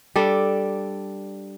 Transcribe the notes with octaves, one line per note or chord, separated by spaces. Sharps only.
G3 D4 A4